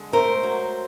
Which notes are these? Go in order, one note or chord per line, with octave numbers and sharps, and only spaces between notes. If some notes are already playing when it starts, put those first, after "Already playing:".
Already playing: D3 G#3
A3 A#4 C5
F#3